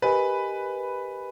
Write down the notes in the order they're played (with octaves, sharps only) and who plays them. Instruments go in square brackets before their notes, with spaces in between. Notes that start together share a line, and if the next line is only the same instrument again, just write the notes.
[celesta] G4 A#4 D#5 G#5 B5 [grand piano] B4